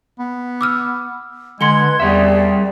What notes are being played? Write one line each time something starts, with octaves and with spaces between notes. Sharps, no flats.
B3
D6 E6 F6
D3 G#3 B4 C6 G#6 C#7 G7
E2 G3 G4 D5 E5